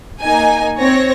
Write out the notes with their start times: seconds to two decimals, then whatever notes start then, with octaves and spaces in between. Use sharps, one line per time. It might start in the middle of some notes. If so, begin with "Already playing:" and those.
0.20 A#3 D#4 G#5
0.79 C4 C#5 A#6